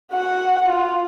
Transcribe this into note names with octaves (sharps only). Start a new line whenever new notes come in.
F#4 F#5
F4